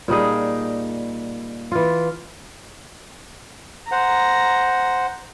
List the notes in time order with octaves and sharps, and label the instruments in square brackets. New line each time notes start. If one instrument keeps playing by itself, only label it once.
[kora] A#2 G3 D#4 G#4
E3 F4
[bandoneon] C5 F#5 [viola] A#5